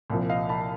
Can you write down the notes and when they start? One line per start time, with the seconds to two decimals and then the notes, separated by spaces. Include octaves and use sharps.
0.10 C2 A#2 F3
0.29 D#5 F5
0.49 A5 B5